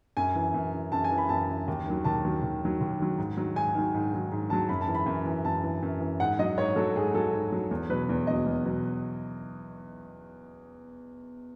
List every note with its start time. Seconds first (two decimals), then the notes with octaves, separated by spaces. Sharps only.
0.17 F#2 G#5
0.35 E3
0.54 F#2
0.73 E3
0.92 F#2 A5
1.04 G#5
1.11 E3
1.18 B5
1.29 F#2 A5
1.49 E3
1.68 D#2
1.86 D#3 F#3
2.04 D#2 A5
2.25 D#3 F#3
2.43 D#2
2.62 D#3 F#3
2.81 D#2
2.99 D#3 F#3
3.18 G#2
3.37 D#3 F#3
3.56 G#2 G#5
3.74 D#3 F#3
3.94 G#2
4.13 D#3 F#3
4.32 G#2
4.50 D#3 F#3 A5
4.69 F#2 B5
4.81 A5
4.88 E3
4.95 B5
5.06 F#2
5.25 E3
5.45 F#2 A5
5.64 E3
5.82 F#2
6.00 E3
6.20 G#2 F#5
6.39 F#3 D#5
6.58 G#2 C#5
6.76 F#3 A4
6.95 G#2 G#4
7.14 F#3 A4
7.33 G#2
7.52 F#3
7.71 E2
7.89 B2 F#3 B4
8.09 E2
8.27 B2 F#3 D#5
8.46 E2
8.65 B2 F#3